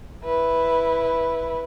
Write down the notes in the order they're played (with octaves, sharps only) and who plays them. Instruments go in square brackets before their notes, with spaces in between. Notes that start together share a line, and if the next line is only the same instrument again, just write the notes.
[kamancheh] E4 B4